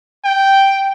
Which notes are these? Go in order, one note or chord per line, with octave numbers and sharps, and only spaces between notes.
G5